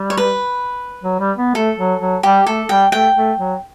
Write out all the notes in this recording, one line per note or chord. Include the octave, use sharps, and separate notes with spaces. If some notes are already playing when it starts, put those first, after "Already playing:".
Already playing: G3
C#5
B4
F#3
G3
B3
A3 A4
F#3
F#3
G3 G4
A3 A4
G3 G5
A3 G5
A3
F#3